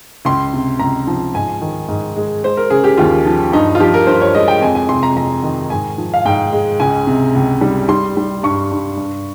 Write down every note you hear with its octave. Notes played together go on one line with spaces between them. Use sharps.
C#2 C6
C3
C#2 A#5
F3
G#2 G#5
D#3
G#2
G#3
G#3 C5
A#4
C#3 G#4
G4
D#2 F4
F3
G2 D#4
F4
F3 G4
A#4
G2 C5
C#5
G#3 D#5
G5
F2 G#5
G#5
C3 C6
A#5
F2 A#5
D#3
G#2 G#5
F3
F5
G#2 G5
G#3
C#2 G#5
C3
C#2
G3
G3 C6
G3
G2 C#6
G2
G2